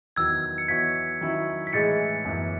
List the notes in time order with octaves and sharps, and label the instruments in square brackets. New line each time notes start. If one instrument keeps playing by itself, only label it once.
[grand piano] E2 D#3 F#3 [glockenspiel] E6 G#6
[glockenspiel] C#7
[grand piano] E3 B3 D#4 F#4 C#5 [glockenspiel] G#6 B6
[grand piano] D#3 F#3 C#4 E4
[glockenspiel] B6
[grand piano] A2 E3 G#3 D#4 G#4 [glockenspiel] A6 C#7
[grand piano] F#2 E3 B3